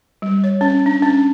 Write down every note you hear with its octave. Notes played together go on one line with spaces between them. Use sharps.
G3
C#5
C#4
D4
C#4